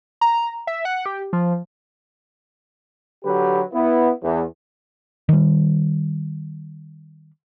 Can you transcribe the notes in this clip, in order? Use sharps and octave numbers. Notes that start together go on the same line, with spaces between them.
A#5
E5
F#5
G4
F3
D3 F#3 G4 B4
B3 E4
E2
D#3 G3